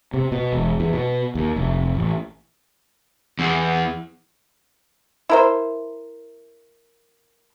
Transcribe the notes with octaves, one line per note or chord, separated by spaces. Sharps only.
C3
B2
E1
E2
B2
D#2
F1
A1
E2
E4 A#4 C5